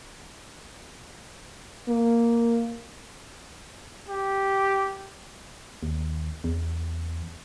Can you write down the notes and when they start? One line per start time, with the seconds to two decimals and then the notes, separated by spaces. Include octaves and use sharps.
1.88 A#3
4.08 G4
5.83 D#2
6.44 E2